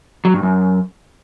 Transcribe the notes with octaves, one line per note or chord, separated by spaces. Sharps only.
F#3
G2
F#2